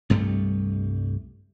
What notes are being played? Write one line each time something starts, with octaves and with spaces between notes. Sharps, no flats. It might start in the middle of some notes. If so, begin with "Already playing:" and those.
C2 G2 G3 A3